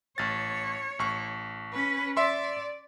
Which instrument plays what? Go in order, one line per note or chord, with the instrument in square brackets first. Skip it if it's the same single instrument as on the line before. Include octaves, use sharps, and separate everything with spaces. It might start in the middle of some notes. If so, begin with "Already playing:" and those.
[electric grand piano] A1 A6 [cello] C#5
[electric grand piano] A1 C#6
[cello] C#4 B4
[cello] D5 [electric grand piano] E5 C6